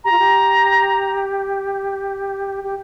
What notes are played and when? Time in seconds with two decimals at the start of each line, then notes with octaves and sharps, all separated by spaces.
0.04 G4 A#5
0.11 F4
0.19 G4
2.64 G4